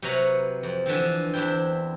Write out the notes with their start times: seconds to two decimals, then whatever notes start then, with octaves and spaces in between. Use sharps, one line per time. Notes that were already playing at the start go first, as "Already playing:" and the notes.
0.02 C3 F#3 B4 C#5 F#5 A#5
0.63 F2
0.86 D3 E3 F3 C4
1.34 E2 C4 D4 E4 G5